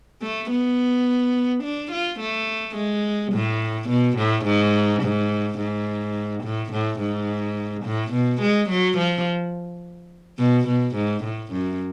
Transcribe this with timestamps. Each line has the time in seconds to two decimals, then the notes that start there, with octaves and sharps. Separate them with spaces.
0.22 A3
0.50 B3
1.63 D4
1.92 F4
2.20 A3
2.76 G#3
3.33 A2
3.89 B2
4.17 A2
4.45 G#2
5.03 G#2
5.59 G#2
6.43 A2
6.72 A2
7.00 G#2
7.85 A2
8.13 B2
8.42 G#3
8.69 F#3
8.98 F3
10.39 B2
10.67 B2
10.96 G#2
11.24 A2
11.52 F#2